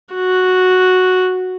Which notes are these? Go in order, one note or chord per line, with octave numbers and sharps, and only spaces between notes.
F#4